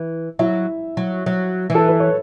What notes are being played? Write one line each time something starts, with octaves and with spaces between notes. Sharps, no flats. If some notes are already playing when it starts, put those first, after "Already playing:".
Already playing: E3
F#3 E4 E5
F#3
F#3
E3
A4
B4
C#5